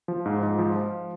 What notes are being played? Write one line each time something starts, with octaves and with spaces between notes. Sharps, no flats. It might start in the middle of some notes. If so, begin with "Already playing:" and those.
F3
G#2
G#2
F3
F3